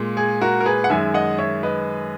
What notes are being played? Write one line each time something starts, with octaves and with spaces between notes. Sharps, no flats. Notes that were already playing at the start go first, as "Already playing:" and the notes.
Already playing: A#2 G#3
G#4
F#4 A#4
A#4
G#4 B4
F#5
F#2 D#3 G#3 E5 G#5
D#5 F#5
C#5 E5
B4 D#5